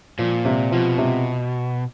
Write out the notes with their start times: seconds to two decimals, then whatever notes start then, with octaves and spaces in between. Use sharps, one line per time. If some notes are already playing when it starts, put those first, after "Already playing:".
0.19 A#2 F3
0.45 C3
0.72 B2 F3
0.98 C3